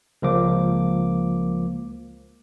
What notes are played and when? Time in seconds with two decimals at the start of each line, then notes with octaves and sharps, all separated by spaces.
0.22 C#2 F3 A#3 D6